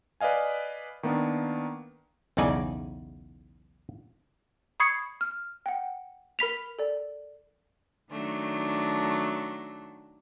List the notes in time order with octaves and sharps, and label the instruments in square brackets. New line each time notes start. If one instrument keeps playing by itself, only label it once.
[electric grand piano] B4 D5 D#5 F5 G#5
D#3 A#3 B3 D4
[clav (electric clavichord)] B1 E2 C#3 D#4 D5 G#5
[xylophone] B5 C#6 D#6 G#6 C7 C#7
F6
F#5 G5
A#4 B5 B6 F7
A4 D5
[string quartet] D#3 F#3 A3 D4